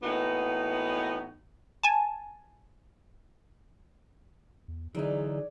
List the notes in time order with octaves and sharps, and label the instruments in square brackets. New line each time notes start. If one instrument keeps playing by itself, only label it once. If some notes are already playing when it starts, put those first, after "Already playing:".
[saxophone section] A2 E3 A#3 B3 D#4 F#4
[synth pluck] G#5 A5
[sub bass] E2
[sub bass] D3 [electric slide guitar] E3 F#3 D#4 [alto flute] G#4 [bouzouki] C#5 D5